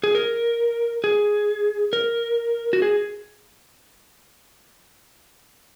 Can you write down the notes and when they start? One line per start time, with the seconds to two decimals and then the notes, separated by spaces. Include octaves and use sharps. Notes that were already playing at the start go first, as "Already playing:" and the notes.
0.04 G#4
0.15 A#4
1.04 G#4
1.93 A#4
2.73 F#4
2.82 G#4